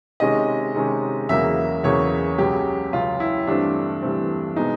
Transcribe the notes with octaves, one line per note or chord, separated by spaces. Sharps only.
C3 D#3 G#3 C#4 D#5
C3 D#3 G#3 C#4
E2 C#3 F#3 A#3 E5
E2 C#3 F#3 A#3 C#5
C#2 C#3 F#3 G4
C#2 C#3 F#3 F4
E4
G2 E3 A3 C4 D4
G2 E3 A3 C4
B2 G#3 B3 D#4